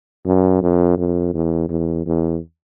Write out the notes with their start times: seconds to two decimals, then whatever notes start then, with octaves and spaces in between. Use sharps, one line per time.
0.25 F#2
0.62 F2
0.98 F2
1.34 E2
1.69 E2
2.06 E2